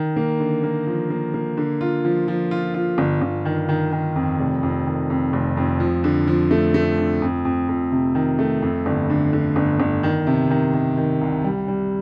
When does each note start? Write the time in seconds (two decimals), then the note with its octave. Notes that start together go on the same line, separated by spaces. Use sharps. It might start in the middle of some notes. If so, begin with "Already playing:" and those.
Already playing: D#3
0.16 A#3
0.40 D3
0.63 A#3
0.87 F3
1.10 A#3
1.34 A#3
1.57 D3
1.81 F4
2.05 F3
2.28 F3
2.51 F4
2.74 F4
2.98 G1
3.21 G1
3.45 D#3
3.69 D#3
3.92 D#3
4.16 F2
4.39 F1
4.63 F2
4.86 D#3
5.10 F2
5.33 F1
5.57 F2
5.80 F3
6.04 D3
6.28 F3
6.51 A3
6.74 A3
6.98 D3
7.22 F2
7.45 F2
7.69 F2
7.92 C3
8.15 D#3
8.39 A3
8.62 F2
8.86 G1
9.10 D3
9.33 D3
9.56 G1
9.80 G1
10.03 D#3
10.27 C3
10.50 D#3
10.74 D#3
10.97 D#3
11.21 C2
11.44 G3
11.68 G3